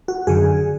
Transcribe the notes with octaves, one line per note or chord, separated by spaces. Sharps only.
F#4
F#2 D3 G#4